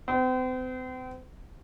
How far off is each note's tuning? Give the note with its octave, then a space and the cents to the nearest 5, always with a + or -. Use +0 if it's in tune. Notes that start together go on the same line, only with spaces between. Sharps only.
C4 -40